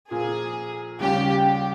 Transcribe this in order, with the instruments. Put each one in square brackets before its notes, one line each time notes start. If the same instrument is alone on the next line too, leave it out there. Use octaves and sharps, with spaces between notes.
[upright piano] A#2 F3 A#3 [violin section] G#4
[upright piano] D#2 C#3 G3 C#4 F4 [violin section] G4
[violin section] G4